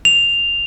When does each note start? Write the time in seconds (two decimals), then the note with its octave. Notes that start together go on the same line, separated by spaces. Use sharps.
0.05 F7